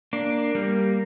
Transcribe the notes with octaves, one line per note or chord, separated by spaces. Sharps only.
A#3 D4
G3 A#3